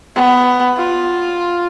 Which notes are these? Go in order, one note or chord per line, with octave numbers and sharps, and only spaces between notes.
B3
F4